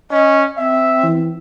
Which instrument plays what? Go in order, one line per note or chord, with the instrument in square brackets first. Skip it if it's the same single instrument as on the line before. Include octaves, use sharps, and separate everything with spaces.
[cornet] C#4 [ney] D#5
[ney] C4 [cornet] E5
[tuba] E3